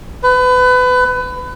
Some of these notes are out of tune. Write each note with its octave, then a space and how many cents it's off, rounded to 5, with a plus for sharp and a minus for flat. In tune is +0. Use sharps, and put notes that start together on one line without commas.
B4 +25